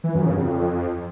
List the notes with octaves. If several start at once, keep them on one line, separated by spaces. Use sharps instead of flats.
E3
F#2
C#3
F2